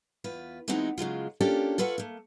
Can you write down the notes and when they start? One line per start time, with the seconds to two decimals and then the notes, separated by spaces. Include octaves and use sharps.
0.24 E2 F4 B4
0.68 E3 G#3 B3 C4 D#4 F#4
0.98 C#3 F#3 G#3 F4
1.41 A#3 C#4 D4 F4 G4 A4
1.78 F4 A4 B4 C#5 F5 F#5
1.98 A3 A#3